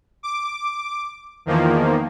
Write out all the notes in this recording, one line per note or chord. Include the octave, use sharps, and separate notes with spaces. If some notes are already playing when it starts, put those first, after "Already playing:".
D6
E2 D#3 F3 A#3